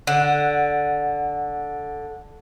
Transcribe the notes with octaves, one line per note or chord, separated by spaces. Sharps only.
D3 F#5